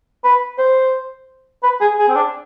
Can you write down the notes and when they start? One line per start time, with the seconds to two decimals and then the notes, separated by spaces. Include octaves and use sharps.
0.24 B4
0.58 C5
1.63 B4
1.81 G#4
1.99 G#4
2.08 C4
2.16 D4